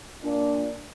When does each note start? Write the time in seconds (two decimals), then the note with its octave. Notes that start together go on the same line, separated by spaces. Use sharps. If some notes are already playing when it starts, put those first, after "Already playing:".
0.22 A#2 D4